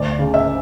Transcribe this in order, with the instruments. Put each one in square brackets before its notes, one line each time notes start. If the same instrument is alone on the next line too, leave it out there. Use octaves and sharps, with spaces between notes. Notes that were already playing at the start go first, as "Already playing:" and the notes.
Already playing: [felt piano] D2 D5
C#3
E5